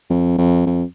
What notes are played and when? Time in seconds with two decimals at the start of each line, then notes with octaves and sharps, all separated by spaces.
0.10 F2
0.38 F2
0.67 F2